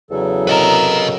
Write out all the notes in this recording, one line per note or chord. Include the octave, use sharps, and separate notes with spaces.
E2 C#3 F#3 A4
A#4 B4 D#5 E6